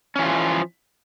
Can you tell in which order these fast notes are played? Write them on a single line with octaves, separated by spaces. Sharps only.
C#4 E3 F4 F3